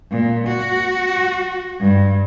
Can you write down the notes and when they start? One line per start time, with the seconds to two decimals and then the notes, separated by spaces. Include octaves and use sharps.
0.11 A#2
0.47 F#4
1.80 G2